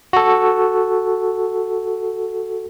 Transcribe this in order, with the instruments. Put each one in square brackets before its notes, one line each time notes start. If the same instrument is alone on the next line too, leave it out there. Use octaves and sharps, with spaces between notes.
[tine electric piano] F#4 A4